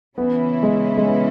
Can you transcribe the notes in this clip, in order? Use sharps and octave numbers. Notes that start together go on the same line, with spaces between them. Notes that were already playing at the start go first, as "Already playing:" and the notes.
C#3 E3 B3 C#4 E4
G#3
G#3
B3